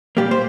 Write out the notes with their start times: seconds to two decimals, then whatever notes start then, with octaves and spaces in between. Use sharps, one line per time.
0.17 A#2 G3 A#3 G4
0.31 C5